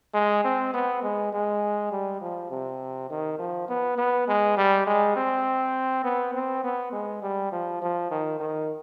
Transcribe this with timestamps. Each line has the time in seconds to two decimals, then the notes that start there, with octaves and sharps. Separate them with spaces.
0.14 G#3
0.44 C4
0.74 B3
1.03 G#3
1.32 G#3
1.91 G3
2.21 F3
2.50 C3
3.10 D#3
3.39 F3
3.68 B3
3.98 B3
4.28 G#3
4.57 G3
4.86 G#3
5.16 C4
6.04 B3
6.34 C4
6.63 B3
6.92 G#3
7.22 G3
7.52 F3
7.82 F3
8.11 D#3
8.40 D#3